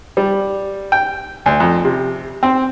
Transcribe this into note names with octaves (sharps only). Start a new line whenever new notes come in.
G3
G5
D2
F2
C3
C4